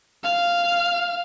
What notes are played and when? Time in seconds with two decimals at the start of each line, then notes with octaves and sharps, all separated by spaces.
0.24 F5